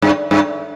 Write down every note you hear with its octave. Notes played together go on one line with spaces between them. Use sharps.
G2
G2